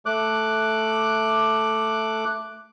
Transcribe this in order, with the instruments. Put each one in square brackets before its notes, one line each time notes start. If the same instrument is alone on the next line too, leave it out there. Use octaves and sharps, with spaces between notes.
[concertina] A3 D6 F#6